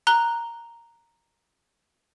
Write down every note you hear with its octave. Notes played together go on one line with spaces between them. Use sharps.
A#5 F#6 G7